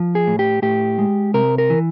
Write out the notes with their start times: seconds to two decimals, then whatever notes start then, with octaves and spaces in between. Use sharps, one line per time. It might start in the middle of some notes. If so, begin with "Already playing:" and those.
Already playing: F3
0.15 G#4
0.27 A2
0.39 G4
0.62 A2 G4
0.98 G#3
1.34 C3 A#4
1.58 A#4
1.70 E3